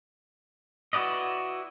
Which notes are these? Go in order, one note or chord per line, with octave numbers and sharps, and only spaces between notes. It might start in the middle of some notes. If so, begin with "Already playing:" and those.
E4 F#4 B4 D5 D#5